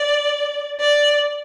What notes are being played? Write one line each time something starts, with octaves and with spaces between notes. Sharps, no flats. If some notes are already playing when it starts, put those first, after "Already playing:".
Already playing: D5
D5